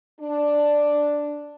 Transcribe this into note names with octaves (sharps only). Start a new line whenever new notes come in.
D4